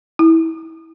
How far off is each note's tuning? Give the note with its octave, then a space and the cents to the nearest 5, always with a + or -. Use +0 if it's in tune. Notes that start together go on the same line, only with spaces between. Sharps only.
E4 -20